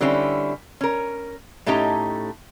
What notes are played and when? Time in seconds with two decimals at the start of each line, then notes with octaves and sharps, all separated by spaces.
0.01 D3 G3 C4 C#4 E4
0.81 C#4 A#4
1.66 A2 A3 C#4 D#4 G4 A#5